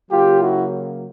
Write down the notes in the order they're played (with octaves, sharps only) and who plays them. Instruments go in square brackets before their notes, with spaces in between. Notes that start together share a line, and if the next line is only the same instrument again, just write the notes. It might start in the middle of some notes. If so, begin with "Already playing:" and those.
[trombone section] C#3 F#3 A#3 F4 G4
E4 F#4